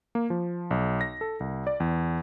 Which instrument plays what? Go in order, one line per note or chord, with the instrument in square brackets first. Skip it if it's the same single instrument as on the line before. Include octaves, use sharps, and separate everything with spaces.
[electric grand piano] A#3
F3
B1
A#6
A4
C2
D5
E2